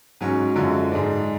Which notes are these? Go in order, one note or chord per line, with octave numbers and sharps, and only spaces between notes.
G#2 F#3 C#4
F#2 D3 F3 G#3 C#4
G#2 G#3 D4